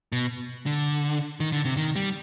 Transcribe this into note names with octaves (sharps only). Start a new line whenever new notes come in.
B2
D3
D#3
D3
C3
D#3
G3